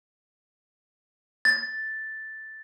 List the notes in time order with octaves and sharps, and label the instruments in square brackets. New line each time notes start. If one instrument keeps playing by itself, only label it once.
[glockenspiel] A6